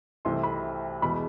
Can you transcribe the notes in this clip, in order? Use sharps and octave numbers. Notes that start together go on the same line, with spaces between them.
C2 C3 E3 A3 C4 C6
B5
E2 B2 G#3 B5